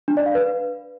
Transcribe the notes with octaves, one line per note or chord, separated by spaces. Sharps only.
D4
D5
F5
B4